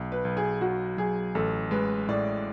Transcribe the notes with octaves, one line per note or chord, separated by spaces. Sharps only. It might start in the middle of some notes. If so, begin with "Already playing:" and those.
Already playing: B1
B4
B1
G#4
F#3 F#4
F#3 G#4
A1 A4
G#3 B4
A2 D5